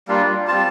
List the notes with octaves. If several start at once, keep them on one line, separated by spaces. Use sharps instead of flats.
G3 A#3 D4 F4
G3 C4 F4 A5